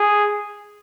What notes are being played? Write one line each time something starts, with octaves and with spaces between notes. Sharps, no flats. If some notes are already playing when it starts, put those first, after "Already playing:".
Already playing: G#4